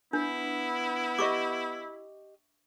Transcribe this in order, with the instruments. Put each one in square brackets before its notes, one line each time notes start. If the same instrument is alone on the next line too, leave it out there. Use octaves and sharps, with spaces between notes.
[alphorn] B3 [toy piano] D4 [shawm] E4
[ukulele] G4 D#5 [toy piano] E5 C#6 D6